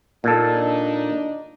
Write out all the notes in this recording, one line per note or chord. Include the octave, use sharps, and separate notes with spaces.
A#2 D4 D#4 A4